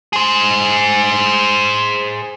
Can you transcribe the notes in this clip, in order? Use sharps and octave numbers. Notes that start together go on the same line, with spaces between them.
G#4 C5